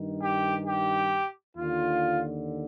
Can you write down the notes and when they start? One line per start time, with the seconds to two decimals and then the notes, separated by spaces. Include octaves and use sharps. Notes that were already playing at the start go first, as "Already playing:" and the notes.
Already playing: G2 D#3
0.21 G4
0.66 G4
1.57 D#2 D3 F4